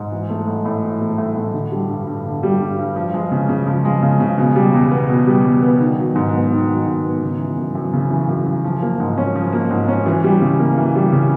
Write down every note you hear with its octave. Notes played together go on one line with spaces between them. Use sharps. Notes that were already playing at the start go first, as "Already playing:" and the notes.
Already playing: G#2
E3
A3
A2
A2
E3
A3
A2
A2
D3
G3
G2
G2
D3
G3
G2
G2
F3
G#3
C#3
C#3
F3
G#3
C#3
C#3
B2
G3
E2
B3
B2
G3
E2
B3
D#3
F#3
G#2
B3
D#3
F#3
G#2
B3
C#3
E3
F#2
F#2
C#3
E3
F#2
F#2
F3
A#3
G#2
C#4
F3
A#3
G#2
C#4
E3
G3
C#3
A#3
E3
G3
C#3